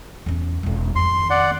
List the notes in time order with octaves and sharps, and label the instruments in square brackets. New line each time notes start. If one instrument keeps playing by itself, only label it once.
[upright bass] E2 C#4
E1 C#4
[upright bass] F2 D#3 [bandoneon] C6
[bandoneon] D5 F#5